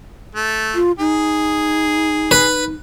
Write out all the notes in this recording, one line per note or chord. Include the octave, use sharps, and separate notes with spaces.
A3
F4
D#4 G#4
B4